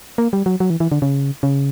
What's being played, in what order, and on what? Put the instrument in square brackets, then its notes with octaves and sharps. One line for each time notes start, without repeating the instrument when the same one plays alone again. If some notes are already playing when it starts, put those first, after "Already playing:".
[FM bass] A#3
G3
F#3
F#3
E3
E3
D3
C#3
C#3